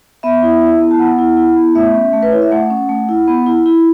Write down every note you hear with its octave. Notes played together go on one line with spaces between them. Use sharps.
B3 E5
E4
E4
B3
A5
B3 F#5
E4
E4
B3
A3 E5
C#4
A3
B4
E4 C#5
E5
A3 F#5
C#4
A3
E4
B3
E4
E4